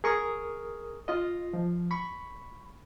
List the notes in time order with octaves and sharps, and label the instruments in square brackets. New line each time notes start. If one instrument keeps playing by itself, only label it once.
[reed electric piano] G#4 A#4 C#6 D#6
F4 D#5
F3
B5 C#6